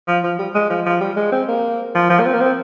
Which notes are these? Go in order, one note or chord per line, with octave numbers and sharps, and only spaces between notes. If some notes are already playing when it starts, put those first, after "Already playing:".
F3
F3
G3
G#3
F3
F3
G3
G#3
C4
A#3
F3
F3
A#3
C4
A#3
C4